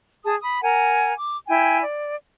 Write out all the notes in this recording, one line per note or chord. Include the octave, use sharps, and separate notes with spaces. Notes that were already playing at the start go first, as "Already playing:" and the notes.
G#4 A5 D#6
B5 D#6
A#4 F#5 G#5 A#5
D6
E4 G5 G#5
D5